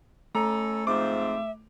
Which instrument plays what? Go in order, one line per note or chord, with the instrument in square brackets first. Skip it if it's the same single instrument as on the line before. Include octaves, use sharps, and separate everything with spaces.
[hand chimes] A3 [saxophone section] C#4 A4 [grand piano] A#5
[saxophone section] G#2 F3 C4 [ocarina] E5 [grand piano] D6